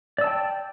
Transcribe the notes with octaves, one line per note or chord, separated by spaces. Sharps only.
D5 G5 A5 E6